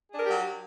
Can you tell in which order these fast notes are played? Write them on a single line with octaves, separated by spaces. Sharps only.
G#4 D4 A#4 G4 F#3